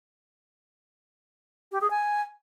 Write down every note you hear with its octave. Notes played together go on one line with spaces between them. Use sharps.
G4
G#4
G#5